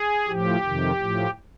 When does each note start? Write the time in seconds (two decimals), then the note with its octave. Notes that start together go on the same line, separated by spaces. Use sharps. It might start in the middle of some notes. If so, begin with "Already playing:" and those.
Already playing: G#4
0.27 A2 F3 G4
0.63 F2 C3 D#3
0.99 A2 F3